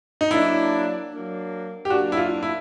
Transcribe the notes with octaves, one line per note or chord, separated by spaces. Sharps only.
D#4
F#3 A#3 D4 E4
F#3 A#3 D4
G4
F#3 A#3 D4 F#4
E4
F4
E4